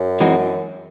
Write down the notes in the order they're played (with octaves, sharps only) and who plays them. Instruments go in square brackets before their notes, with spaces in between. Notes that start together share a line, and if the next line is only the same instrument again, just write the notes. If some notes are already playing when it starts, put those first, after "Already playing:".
Already playing: [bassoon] F#2
[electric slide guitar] E3 G#3 C4 D#4 F#4